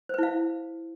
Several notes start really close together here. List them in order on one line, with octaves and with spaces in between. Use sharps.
C5 B4 E4 F5